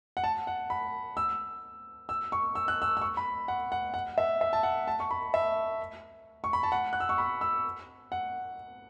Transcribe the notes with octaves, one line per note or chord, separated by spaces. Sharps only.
F#5
A5
F#5
B5
E6
E6
C#6
E6
F#6
E6
E6
C#6
B5
F#5
F#5
F#5
E5
E5
A5
F#5
A5
C#6
B5
E5
C#6
B5
A5
F#5
F#6
E6
C#6
B5
E6
F#5